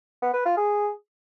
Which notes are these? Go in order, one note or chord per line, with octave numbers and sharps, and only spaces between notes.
B3
B4
F4
G#4